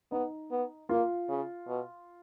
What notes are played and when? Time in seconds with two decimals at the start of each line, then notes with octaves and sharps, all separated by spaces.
0.11 B3 D#4
0.51 B3
0.89 A#3 F4
1.29 C#3
1.68 B2